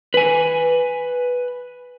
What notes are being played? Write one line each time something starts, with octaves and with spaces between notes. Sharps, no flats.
B4 G#5